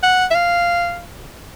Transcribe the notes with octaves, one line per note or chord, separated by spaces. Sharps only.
F#5
E5
F5